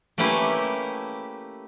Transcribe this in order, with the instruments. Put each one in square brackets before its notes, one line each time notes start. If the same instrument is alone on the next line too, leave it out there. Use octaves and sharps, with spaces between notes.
[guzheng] A3 A#3 C#4 E4 G4 B4